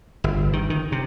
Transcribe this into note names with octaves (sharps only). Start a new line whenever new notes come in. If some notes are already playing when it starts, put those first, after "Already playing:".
G1
D#3
D#3
C3